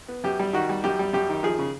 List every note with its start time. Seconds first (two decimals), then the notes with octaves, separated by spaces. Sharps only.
0.08 B3
0.24 F#2 G4
0.39 G3
0.53 D#3 F#4
0.69 G3
0.84 F#2 G4
0.99 G3
1.13 F#2 G4
1.29 D#3
1.43 F3 G#4
1.59 C#3